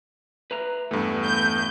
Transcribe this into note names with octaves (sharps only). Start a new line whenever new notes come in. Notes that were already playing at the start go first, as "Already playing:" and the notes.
B4 E5 A#5
E2 G2 A3
G6